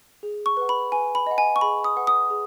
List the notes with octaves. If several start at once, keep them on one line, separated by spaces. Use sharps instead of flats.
G#4
C#6
B4 F#5
B5
B4 G#5
B5
D#5 F#5
G#5
C#6
G#4 B5
D#6
B4 F#5
D#6
G#4